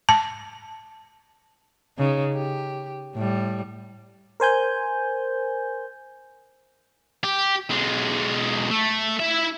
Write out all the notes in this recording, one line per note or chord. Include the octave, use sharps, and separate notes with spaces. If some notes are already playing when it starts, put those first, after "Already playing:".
A5
C#3 D#4
G4
A2 G3
A#4 C5 G#5 G6
G4
B1 G#3
A3
E4 E5